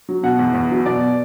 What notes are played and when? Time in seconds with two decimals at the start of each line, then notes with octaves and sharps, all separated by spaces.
0.09 F#3
0.23 B2 F#5
0.39 E2
0.54 E2
0.70 F#3
0.86 B2 D5